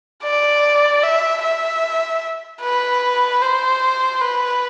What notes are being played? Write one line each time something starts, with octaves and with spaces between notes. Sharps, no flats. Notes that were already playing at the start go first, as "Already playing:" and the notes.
D5
E5
E5
B4
C5
B4